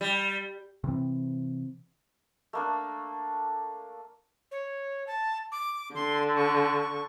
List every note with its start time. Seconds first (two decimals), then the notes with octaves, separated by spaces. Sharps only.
0.01 G3
0.84 C3 E3 C4
2.53 A3 A#3 D4
4.51 C#5
5.07 A5
5.52 D6
5.95 D3 C6
6.36 C#6